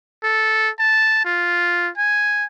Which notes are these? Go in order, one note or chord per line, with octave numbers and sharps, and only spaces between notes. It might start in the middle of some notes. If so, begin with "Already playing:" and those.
A4
A5
F4
G#5